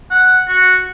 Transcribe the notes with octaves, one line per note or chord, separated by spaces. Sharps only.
F#5
F#4